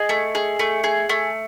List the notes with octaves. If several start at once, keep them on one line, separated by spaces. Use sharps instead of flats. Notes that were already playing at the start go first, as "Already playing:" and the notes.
Already playing: G#4 D#5
A3
G#4
A3
G#4
A3